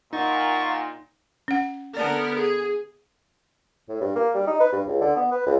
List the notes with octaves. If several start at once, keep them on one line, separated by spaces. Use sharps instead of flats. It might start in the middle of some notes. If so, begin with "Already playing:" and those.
A#2 D#4 F#5 C#6 A6
C#4 F#5
D3 B3 A#4 D5 A5
G#4
A2
G2
A#3
G3
D#4
B4
G2
C#2
D3
B3
B4
C#2